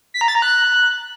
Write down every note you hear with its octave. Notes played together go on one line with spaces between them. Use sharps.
B6
A#5
A6
A#5
F#6